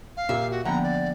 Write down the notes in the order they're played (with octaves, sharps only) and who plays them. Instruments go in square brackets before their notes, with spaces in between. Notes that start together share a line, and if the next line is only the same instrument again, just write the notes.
[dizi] F5
[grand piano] A#2 G4 A#4 [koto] E5
[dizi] F#4
[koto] D3 [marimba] F3 A#3 B3 [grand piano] F#5 G5 [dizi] A#5
[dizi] D5